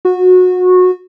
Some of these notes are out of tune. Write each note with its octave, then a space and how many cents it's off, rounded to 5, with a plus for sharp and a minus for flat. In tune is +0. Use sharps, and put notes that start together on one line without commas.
F#4 -20